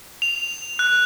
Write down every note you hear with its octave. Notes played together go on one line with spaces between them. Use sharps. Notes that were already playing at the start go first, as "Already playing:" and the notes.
F7
F#6